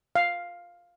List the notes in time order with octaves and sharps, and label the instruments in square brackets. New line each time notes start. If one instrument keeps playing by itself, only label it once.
[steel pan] F5